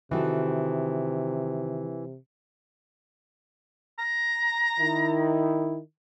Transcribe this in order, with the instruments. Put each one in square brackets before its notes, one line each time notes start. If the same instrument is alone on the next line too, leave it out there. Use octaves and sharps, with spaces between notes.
[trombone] C3 [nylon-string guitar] D#3 F#4 A4 [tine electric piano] E3
[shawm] A#5
[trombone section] D#3 E4